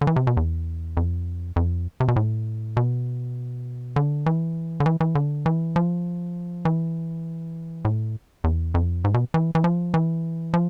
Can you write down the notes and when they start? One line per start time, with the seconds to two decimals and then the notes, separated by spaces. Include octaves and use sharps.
0.01 D3
0.07 E3
0.16 C3
0.27 B2
0.37 E2
0.97 F2
1.56 F2
2.00 C3
2.08 B2
2.16 A2
2.77 B2
3.96 D3
4.26 E3
4.80 D3
4.86 E3
5.00 E3
5.15 D3
5.46 E3
5.76 F3
6.65 E3
7.85 A2
8.44 E2
8.74 F2
9.04 G#2
9.14 B2
9.34 E3
9.55 E3
9.64 F3
9.94 E3
10.54 F3